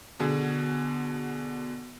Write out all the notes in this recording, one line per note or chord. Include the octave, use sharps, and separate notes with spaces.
B2 D3 G#4